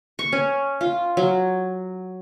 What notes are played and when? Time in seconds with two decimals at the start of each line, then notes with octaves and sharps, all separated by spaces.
0.19 C#6
0.32 C#4
0.81 F4
1.17 F#3